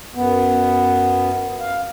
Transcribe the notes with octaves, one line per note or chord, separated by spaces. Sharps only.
F#2 B3
F5